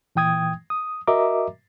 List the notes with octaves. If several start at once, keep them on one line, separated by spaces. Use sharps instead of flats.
A#2 E3 G5 D#6 G#6
D#6
F#4 A#4 D#5 E5 A#5 D6